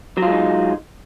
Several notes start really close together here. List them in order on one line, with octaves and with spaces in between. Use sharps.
F#3 F4 G#3 D#4